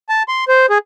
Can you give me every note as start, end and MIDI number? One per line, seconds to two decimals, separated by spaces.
0.09 0.23 81
0.28 0.45 84
0.48 0.66 72
0.70 0.78 68